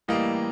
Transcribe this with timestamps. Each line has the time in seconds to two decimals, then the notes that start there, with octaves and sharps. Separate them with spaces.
0.08 A2 E3 G3 A#3 D#5 F5